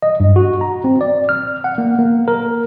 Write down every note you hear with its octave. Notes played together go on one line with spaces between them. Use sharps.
D#5
G2
F#4
A#5
C4
D5
F6
F#5
A#3
A#3
A#4